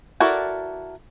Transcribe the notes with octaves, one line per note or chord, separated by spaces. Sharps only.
E4 F#4 A4 A#4 D5